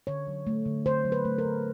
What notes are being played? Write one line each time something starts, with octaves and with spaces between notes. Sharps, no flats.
D3 C#5
F#3
A3
D3
D3 C5
F#3
B4
A3
A#4
D3